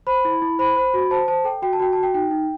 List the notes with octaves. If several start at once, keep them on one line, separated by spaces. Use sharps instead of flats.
C5 B5
E4
E4
C5 B5
C5
F#4
C5 A5
C5 A5
A4 G5
F#4 G5
A5
F#4 G5
F#4 A5
G5
D#4 G5
D#4